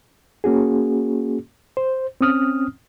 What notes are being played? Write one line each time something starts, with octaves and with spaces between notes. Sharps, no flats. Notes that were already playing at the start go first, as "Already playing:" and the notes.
A#3 C#4 F#4 G#4
C5
C4 C#4 D#6 F6